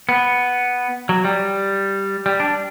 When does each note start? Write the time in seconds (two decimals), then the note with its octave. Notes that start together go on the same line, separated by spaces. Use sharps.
0.09 B3
1.09 F#3
1.25 G3
2.26 G3
2.40 D4